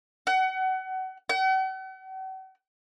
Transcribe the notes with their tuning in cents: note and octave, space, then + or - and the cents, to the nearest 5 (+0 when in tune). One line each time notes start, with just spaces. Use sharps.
F#5 +30
F#5 +45